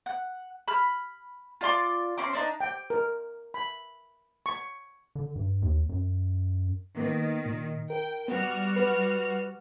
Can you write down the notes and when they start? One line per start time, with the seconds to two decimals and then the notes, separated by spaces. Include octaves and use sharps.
0.06 F#5
0.68 B5 F6
1.61 F4 D5 C6 D6
2.18 C4 C#4 C6 D6
2.33 C4 D4 D#4
2.61 G5
2.90 A#4
3.54 B5
4.46 C#6
5.15 D3
5.36 G2
5.62 D#2
5.89 F#2
6.97 D#3 A#3 B3
7.46 A#2
7.90 A#4 G5
8.28 G3 B3 F#4 F6
8.76 B4